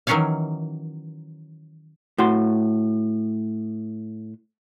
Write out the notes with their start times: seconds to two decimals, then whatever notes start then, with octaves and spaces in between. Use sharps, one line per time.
0.07 D#3 E3 F#3 C#4 C#5 F5
2.18 A2 F#4 C6